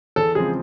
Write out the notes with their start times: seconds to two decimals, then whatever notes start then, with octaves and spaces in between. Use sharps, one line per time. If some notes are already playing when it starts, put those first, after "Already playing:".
0.16 E2 A4
0.35 C#3 F3 G#3 C4 G#4